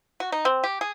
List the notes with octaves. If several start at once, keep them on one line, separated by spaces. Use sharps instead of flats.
F#4
D#4
C4
G4
G#4